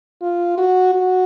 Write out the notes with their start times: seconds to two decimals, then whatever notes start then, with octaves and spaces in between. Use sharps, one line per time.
0.22 F4
0.58 F#4
0.94 F#4